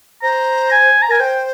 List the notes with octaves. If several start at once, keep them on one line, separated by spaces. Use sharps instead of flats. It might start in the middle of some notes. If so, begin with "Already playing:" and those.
C5 A#5
G#5
A#5
A#4 G#5
C5 G5